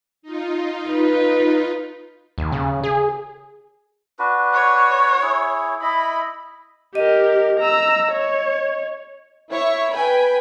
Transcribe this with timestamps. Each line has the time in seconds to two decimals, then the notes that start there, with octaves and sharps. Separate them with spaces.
0.22 D#4 F4
0.90 B4
2.38 D#2
2.52 C#3
2.84 G#4
4.19 D4 F#4 B4
4.54 C#5
5.22 E4 G#4
5.82 E4 D#5 B5
6.95 G4 A#4 D#5
7.60 A#5 E6
8.12 C#5
9.50 E4 C#5 E5 C#6
9.91 B4 G5 G#5 B5